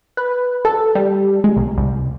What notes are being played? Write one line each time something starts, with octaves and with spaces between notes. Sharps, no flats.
B4
A4
G3
G#3
B1
C2